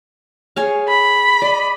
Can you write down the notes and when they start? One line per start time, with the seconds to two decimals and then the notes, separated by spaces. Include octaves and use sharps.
0.56 G#4 C#5 F5
0.89 B5
1.42 D5 D#5